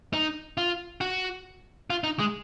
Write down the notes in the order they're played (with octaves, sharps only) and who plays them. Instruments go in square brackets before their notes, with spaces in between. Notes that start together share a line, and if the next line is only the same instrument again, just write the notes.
[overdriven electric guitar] D#4
F4
F#4
F4
D#4
G#3